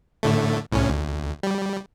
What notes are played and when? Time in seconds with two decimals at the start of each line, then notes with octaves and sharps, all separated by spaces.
0.23 A2 D3 A3
0.72 C2 A2 C#4
0.90 D2
1.43 G3